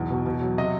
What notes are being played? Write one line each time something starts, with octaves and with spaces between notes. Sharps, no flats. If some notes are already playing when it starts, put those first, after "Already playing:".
Already playing: B1 E2
B2
B2
F#3
C3 D#5